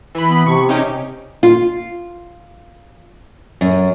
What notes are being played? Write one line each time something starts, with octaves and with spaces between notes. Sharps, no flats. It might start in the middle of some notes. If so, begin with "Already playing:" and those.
E3 B5
B3
C3 C#6
C#4 D#4 G4
F4
F#2